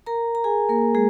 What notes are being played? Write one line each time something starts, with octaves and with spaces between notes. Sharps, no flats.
A#4 A#5
A#5
G#4 G#5
A#3 A#4
G#3 G#4